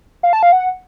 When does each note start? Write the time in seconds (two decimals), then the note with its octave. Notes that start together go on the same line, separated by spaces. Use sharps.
0.23 F5
0.33 A5
0.43 F5
0.52 F#5